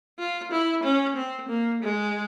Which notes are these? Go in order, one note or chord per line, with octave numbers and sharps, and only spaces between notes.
F4
E4
C#4
C4
A#3
G#3